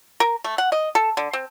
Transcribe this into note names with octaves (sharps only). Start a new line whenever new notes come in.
A#4
A3
F#5
D#5
A4
D3
C4